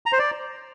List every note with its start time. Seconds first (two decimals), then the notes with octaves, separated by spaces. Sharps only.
0.06 A#5
0.12 C5
0.19 D5